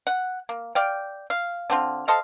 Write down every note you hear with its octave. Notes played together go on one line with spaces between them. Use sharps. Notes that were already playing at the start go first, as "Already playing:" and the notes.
F#5
A#3
D5 F5 G5
F5
D3 C4 F4
A4 C5 D#5 F5